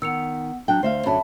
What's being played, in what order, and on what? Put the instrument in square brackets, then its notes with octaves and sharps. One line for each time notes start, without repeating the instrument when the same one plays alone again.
[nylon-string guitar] D#3 [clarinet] B3 [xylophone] E6 C#7 F7
[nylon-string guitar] F#3 F#5 G5 [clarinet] D4
[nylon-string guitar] D2 E5 F5 [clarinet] C5
[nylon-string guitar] F#2 D3 F#3 [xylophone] E5 A5 B5